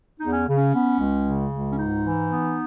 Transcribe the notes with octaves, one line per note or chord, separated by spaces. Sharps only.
E2 D#4
C#4
C#3
C#4
B3
C#2
C#3
C#2
C#4
G#2 D#4
E3
B3